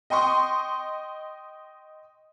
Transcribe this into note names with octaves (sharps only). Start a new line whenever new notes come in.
D#5 G5 C6 C#6 D#6